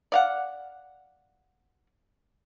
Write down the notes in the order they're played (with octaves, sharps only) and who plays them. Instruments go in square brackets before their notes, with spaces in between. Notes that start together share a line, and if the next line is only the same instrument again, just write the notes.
[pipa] D5 F5 F#5